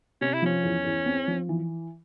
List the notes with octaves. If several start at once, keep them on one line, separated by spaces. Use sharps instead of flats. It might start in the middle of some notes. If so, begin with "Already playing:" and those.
C3 C#4
E4
F3 C#4
E2
E2
C4
F3
E3